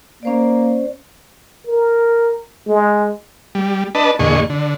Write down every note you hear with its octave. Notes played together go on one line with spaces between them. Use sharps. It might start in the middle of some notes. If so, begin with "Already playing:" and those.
A#3 C#4 C5 D5
A#4
G#3
G3
D4 B4 D#5 A5
E2 A#2 D3 G#4 D#5 C#6
D3